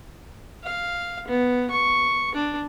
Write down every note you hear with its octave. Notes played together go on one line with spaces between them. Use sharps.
F5
B3
C#6
D4